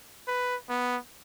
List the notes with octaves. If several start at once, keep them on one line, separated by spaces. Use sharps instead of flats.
B4
B3